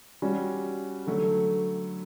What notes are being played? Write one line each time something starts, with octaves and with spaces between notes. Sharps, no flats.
G3 C#4 F#4
D3 F#3 A3